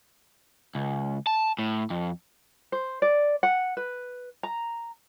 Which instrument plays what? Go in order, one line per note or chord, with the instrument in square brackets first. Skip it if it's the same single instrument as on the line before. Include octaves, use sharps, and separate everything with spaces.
[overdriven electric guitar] C#2
A5
A2
F2
[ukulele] C5
D5
F#5
B4
A#5